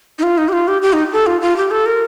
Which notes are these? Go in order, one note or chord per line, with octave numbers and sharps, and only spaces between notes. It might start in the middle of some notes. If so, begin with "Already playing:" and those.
D#4
F4
D#4
G4
F4
G4
G4
D#4
A4
F4
F4
G4
A4
A#4